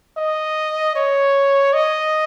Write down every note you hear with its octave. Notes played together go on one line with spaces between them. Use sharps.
D#5
C#5
D#5